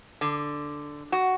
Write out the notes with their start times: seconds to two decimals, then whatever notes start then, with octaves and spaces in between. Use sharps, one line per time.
0.21 D3
1.12 F#4